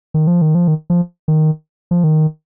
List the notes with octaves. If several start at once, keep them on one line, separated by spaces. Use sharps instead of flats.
D#3
F3
D#3
F3
D#3
F3
D#3
F3
D#3